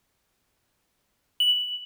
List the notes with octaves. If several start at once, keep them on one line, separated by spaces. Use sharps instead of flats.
F#7